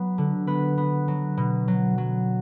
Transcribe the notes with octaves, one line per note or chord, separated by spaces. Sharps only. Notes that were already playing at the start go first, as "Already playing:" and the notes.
Already playing: F#3 B3
D3
B3 B4
B3
F#3
B2
F#3
F#3